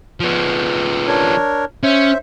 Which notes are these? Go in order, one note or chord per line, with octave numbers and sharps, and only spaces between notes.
F3 B3
D4 A#4 C#5
C#4 C5 E5